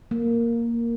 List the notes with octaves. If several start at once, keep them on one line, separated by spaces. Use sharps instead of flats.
A#3